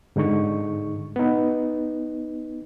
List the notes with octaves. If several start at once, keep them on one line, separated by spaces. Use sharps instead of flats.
G#2 D3 G#3 D#4 C#6
B3 D#4